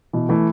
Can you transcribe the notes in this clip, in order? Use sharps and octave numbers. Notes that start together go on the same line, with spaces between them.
B2 E3
E3 A3